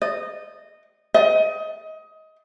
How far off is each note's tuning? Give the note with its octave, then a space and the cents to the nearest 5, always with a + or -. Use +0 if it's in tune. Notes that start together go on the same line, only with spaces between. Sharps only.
D#5 -15
D#5 +20